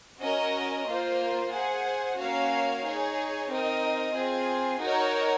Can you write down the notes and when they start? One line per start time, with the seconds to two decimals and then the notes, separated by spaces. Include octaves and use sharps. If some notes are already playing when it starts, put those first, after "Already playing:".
0.23 C#4 F#4 A#4 D#5
0.88 A#3 F4 C5
1.54 G#4 C5 F#5
2.19 A#3 C#4 F#4 C#5 F5
2.85 D#4 G#4 C#5
3.50 C4 D#4 A#4 D#5
4.16 C4 F4 G#4
4.81 D#4 F#4 A#4 C#5